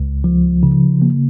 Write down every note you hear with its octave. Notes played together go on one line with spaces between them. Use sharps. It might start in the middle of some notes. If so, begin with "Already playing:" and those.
Already playing: C#2
F3
C#3
A#3